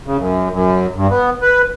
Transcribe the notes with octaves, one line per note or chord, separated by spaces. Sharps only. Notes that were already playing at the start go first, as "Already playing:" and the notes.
C#3
F#2
F#2
G2
B3
B4